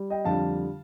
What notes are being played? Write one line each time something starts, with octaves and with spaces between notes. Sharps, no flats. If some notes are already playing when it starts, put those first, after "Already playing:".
Already playing: G3
D#5 G5
F2 D3 G3 F5 A5